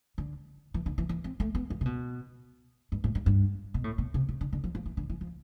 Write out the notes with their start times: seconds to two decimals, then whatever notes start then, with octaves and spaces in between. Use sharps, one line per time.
0.18 D3
0.74 E3
0.86 D3
0.98 E3
1.09 E3
1.24 C4
1.40 A3
1.55 B3
1.70 F3
1.81 C3
1.85 B2
2.92 G2
3.04 A2
3.15 G2
3.26 G2
3.74 B2
3.84 A2
3.98 B2
4.14 C3
4.29 C3
4.41 D3
4.53 D3
4.64 F3
4.75 F3
4.86 E3
4.97 D3
5.10 E3
5.21 F3